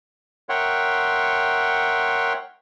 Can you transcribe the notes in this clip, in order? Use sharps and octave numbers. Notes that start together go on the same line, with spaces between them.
A#4 C#5 E5 F#5 G5 C6